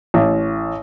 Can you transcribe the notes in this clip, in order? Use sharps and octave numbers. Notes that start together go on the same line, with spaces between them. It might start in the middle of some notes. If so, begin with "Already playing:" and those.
A1